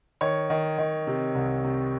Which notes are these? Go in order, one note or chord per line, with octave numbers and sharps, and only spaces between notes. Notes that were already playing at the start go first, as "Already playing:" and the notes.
D#3 C#5
D#3
D#3
C3
C2
C3